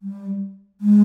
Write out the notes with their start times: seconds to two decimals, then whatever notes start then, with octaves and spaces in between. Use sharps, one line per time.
0.02 G3
0.81 G#3